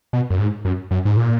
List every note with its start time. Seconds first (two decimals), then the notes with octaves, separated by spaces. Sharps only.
0.13 B2
0.30 F#2
0.39 G#2
0.65 F#2
0.91 F#2
1.05 G#2
1.17 A#2